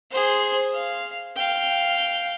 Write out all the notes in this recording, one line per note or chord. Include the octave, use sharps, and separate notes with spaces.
G#4 C5
F5
F5 G5